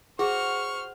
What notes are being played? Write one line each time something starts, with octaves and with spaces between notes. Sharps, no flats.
F#4 G#4 C5 C#6 F6